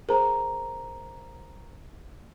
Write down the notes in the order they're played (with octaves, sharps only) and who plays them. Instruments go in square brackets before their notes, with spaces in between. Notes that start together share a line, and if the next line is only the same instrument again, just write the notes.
[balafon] G#4 [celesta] A#4 C5 A#5